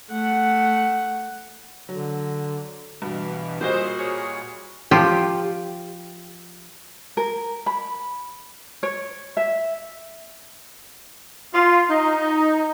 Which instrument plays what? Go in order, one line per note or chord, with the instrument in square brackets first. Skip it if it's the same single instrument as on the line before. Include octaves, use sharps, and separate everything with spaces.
[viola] A3 F#5
[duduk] D3 [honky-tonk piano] F#3
[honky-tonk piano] G2 [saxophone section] B2 [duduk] E3
[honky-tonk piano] A#2 G3 D#5 [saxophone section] E4 G#4 C5 [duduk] F#4
[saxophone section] G#4 A#4 C#5
[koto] F3 F4 G4
[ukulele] A#4
B5
C#5
E5
[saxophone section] F4
D#4